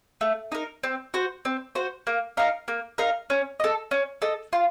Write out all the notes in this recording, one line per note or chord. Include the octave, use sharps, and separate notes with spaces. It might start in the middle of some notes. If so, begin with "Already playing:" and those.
A3
D#4 A#4
C4
F#4 C5
C4
F#4 C5
A#3
D#4 A#4 F5
A#3
D#4 A#4 F5
C#4
A4 D#5
C#4
A4 D#5
F4